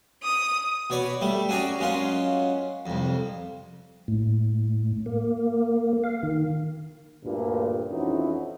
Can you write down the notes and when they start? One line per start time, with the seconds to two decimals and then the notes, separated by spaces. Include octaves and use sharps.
0.24 D#6
0.90 B2 C#5 D5 B5
1.21 G3 A3
1.49 C#4 F#4 G#4 D5 A#5
1.79 F#2 G#3 C#4 F4 F#5
2.86 C2 F2
4.08 A2
5.06 A#3
6.04 F5
6.23 D#3
7.24 D2 G2 A#2
7.90 F2 E3 C#4 D#4 E4 F#4